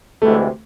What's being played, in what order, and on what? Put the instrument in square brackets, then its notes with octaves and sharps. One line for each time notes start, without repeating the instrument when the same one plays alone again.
[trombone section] D2 C3 E3 G#3 [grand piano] A3